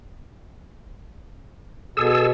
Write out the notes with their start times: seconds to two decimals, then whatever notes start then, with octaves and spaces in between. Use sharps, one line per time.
1.97 B2 G#4 A4 E6